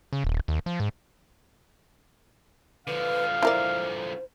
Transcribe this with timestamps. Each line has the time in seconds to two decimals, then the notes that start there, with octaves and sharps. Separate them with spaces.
0.13 C#3
0.24 D#1
0.48 D#2
0.66 F3
0.80 G#2
2.87 D3 F3 B4 F5
3.43 E4 A#4 C5 D5